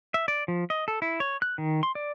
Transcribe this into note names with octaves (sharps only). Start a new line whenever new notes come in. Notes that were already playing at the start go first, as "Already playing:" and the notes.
E5
D5
F3
D#5
A4
E4
C#5
F#6
D#3
C6
D5